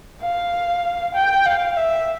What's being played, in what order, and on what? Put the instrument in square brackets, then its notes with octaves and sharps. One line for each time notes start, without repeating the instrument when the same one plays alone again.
[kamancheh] F5
G5
F5
E5